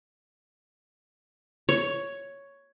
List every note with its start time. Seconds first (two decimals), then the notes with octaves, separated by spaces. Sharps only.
1.69 C#5